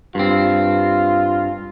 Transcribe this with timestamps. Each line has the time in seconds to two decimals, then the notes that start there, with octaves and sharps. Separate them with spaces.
0.15 G2 C4 F4